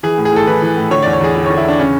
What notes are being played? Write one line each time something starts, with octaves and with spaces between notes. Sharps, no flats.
E3 G#4
A2
G#4
A2 A4
E3 B4
E3
A2
D3 C#5
E2 D5
C#5
E2 G#4
D3
D3 C#5
E4
E2 D4
C#3 C#4